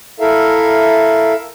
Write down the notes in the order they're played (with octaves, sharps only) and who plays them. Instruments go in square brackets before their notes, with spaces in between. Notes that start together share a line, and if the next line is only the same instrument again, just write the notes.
[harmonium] E4 A4 A#4 E5 F5